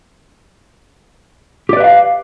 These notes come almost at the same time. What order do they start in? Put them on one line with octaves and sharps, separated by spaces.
G4 D5 B4 E5 F5